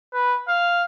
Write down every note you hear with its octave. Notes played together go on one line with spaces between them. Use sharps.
B4
F5